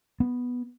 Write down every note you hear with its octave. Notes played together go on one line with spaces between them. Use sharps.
B3